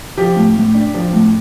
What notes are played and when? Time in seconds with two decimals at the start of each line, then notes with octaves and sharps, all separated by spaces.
0.18 F3 G4
0.37 A2
0.56 A2
0.74 D4
0.95 F3
1.13 A2